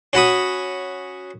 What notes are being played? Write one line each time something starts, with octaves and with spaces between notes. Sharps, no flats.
C#4 F#4 B5 D#6